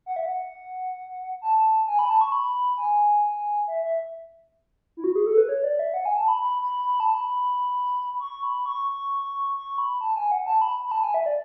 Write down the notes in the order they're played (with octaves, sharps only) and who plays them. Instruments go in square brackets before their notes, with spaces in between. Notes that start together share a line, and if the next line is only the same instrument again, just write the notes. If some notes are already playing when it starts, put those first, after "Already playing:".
[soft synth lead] F#5
E5
F#5
A5
G#5
B5
A5
C#6
B5
G#5
E5
E5
E4
F#4
G#4
A4
B4
C#5
D5
E5
F#5
G#5
A5
B5
B5
B5
B5
A5
B5
C#6
B5
C#6
C#6
B5
A5
G#5
F#5
A5
B5
B5
A5
G#5
E5
D5